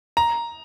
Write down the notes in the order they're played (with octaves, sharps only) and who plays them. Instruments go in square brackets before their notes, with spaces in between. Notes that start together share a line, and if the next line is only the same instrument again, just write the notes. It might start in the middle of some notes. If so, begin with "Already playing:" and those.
[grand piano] A#5